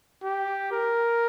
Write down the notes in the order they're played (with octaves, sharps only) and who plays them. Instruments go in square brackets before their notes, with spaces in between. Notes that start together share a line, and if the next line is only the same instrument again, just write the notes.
[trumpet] G4
A#4